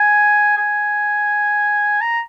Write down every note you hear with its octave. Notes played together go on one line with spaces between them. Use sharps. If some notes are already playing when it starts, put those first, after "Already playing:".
Already playing: G#5
G#5
A#5